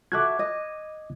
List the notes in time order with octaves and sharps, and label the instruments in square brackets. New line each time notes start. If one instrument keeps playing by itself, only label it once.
[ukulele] F#4 A4 E5 [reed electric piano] D6 F#6 G#6
[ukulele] D#5